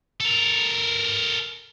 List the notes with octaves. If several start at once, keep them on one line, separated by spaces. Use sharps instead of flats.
A4 A#4